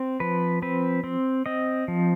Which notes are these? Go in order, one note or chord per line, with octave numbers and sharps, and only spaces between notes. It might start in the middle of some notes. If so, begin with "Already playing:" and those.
Already playing: C4
F3 B4
C4 B4
C4
C4 D#5
F3